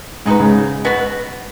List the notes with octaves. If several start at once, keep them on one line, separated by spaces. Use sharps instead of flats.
G#2 G#3 D#4 F#4 B4
G#2 C#3
B2 B3 F#4 B4